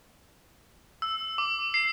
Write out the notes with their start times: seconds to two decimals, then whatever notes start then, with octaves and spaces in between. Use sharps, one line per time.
1.02 E6
1.38 D6
1.74 C7